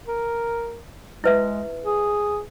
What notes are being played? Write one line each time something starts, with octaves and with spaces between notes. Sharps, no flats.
A#4
G#3 E4 B4 E5
G#4